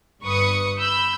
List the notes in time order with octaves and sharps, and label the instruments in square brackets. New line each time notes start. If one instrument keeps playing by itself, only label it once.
[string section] G1 G2 B4 C#6 D#6 C#7
B5 E6 G6